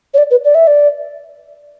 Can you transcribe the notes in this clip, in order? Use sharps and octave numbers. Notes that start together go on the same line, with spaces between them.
C#5
D5
B4
D5
E5
D5